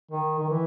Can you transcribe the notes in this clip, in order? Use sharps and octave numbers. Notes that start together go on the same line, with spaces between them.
D#3
D#3
E3